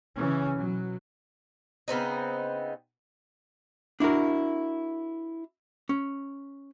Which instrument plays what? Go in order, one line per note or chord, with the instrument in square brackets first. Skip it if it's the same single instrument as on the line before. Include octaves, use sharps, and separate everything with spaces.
[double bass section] C#3 E3 C#4
B2 F#3
[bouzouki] C#3 B3 C4 D#4
[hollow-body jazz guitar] D4 E4 F#4 A#4
C#4